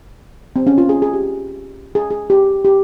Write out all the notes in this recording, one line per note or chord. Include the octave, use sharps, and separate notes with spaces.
C4
C#4
F4
G#4
G#4
G4
G#4
G#4
G4
G4